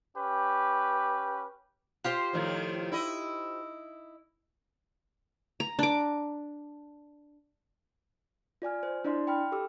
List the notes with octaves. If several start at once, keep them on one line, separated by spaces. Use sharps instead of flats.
C#4 G4 B4
F4 G4 C5
A2 D#3 F3
E4 D#5
A#5
D4 D6
F4 D5 G#5 F6
C5
D4 E4 D5 D#5 C6
G5 B5 F6
G4 A4 D6 E6